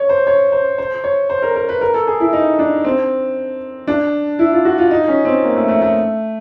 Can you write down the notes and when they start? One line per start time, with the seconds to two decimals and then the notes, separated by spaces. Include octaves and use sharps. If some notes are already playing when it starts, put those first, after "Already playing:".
Already playing: C#5
0.09 C5
0.27 C#5
0.52 C5
0.78 C5
1.04 C#5
1.30 C5
1.42 A#4
1.55 A#4
1.69 B4
1.81 A#4
1.94 A4
2.07 G#4
2.20 E4
2.33 D#4
2.59 D4
2.85 C4
3.87 D4
4.39 E4
4.52 F4
4.65 F#4
4.78 F4
4.91 D#4
5.08 C#4
5.25 C4
5.42 A#3
5.56 A3
5.68 A3
5.82 A3